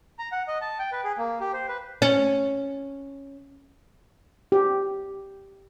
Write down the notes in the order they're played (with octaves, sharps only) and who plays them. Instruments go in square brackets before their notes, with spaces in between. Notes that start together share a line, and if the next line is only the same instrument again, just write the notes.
[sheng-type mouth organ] A#5
F#5
D#5
A5
G5
B4
G#4
A#3
G4
C5
B4
[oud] C#4
[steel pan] G4